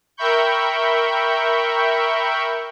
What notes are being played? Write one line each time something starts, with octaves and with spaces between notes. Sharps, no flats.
A#4 E5 G5 B5 C#6 G6